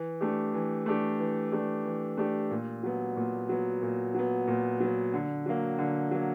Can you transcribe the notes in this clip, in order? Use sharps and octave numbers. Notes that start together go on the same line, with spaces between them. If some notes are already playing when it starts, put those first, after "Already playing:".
Already playing: E3
A3 D4 G4
E3
A3 D4 G4
E3
A3 D4 G4
E3
A3 D4 G4
A#2
F#3 B3
A#2
F#3 B3
A#2
F#3 B3
A#2
F#3 B3
D3
F#3 A#3
D3
F#3 A#3